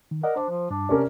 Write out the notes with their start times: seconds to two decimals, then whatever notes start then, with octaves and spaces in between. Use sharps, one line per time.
0.11 D#3
0.23 A#4 D5 D#5 F#5
0.36 D4 C5
0.50 F3
0.71 G2 D4
0.89 C3 C#4 A#4 D5